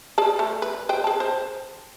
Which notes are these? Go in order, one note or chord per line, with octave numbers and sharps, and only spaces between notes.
G#4 D5 A5
A3
B4
B4 C5 G5
G#4 A5
C5